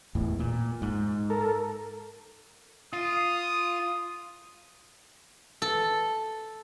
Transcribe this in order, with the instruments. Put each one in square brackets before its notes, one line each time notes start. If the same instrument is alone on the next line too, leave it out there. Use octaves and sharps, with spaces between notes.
[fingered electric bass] E2 A2 E3
A#2
G#2
[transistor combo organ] A4 A#4
[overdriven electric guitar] F4 [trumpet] D#6
[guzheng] A4